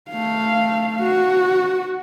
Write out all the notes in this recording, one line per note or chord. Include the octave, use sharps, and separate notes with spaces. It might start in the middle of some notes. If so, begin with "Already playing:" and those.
A3 F5
F#4